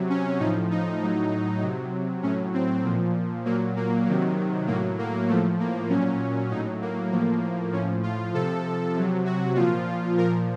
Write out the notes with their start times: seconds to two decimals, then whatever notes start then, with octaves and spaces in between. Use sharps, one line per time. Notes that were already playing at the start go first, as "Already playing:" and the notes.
Already playing: C3 F#3
0.10 C#4
0.39 A2 F3 D#4
0.71 D#4
1.02 A2 F#3
1.62 C3 F#3
2.23 A2 F#3 C#4
2.54 C4
2.85 A#2 F3
3.45 A#2 F#3 A#3
3.76 A#3
4.06 C3 D#3 F#3
4.67 A2 F#3 A#3
4.99 A#3
5.28 A2 F3 A3
5.60 A#3
5.89 A#2 F#3 C#4
6.51 A2 F#3 D#4
6.82 A#3
7.12 A2 F3 A#3
7.72 A2 F3 C#4
8.03 F4
8.34 C3 F3 A4
8.95 C3 F#3
9.25 F#4
9.56 A#2 F3 F4
10.18 A#2 F3 A#4